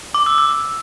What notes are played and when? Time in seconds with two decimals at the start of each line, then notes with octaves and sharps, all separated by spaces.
0.14 D6
0.26 E6
0.38 E6